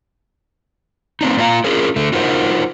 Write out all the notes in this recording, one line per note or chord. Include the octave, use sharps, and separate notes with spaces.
A#3 C4 D4 D#4
A#3 D4 F4 F5 A#5
C#4 F4 G#4 A#4
D3 A3
D#4 F4 F#4 A#4 C5